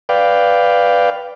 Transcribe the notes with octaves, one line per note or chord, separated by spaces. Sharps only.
B4 D5 F5 G5